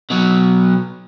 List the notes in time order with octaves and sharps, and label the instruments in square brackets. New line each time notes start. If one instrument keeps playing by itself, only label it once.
[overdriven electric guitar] B2 F#3